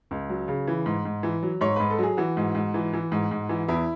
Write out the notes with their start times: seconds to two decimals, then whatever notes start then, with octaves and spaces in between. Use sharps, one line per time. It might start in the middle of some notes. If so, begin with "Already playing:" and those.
0.11 C#2
0.30 F#3
0.48 C#3
0.67 E3
0.86 G#2
1.05 G#2
1.23 E3
1.43 F#3
1.61 G#2 C#5
1.76 G#2 B4
1.90 A4
1.99 F#3 G#4
2.17 E3 F#4
2.37 G#2
2.55 G#2
2.74 E3
2.93 E3
3.12 G#2
3.31 G#2
3.49 E3
3.68 E2 E4